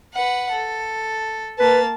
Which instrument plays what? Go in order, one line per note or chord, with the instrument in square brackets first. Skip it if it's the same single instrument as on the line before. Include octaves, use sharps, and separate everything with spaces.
[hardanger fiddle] B4 F#5
A4
[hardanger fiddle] A#3 A5 [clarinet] B4